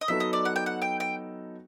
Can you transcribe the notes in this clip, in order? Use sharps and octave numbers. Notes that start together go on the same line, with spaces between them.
D#5
F#3 B3 D#4 F#4 A4 E5
D#5
D5
F#5
G5
F#5
G5
G5